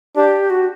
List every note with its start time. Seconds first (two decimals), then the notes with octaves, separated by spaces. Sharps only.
0.16 D4 G4
0.50 F#4